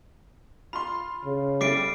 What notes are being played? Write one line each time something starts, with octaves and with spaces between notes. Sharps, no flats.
F4 B5 C6
C#3
G3 A3 E4 D6 C7 D7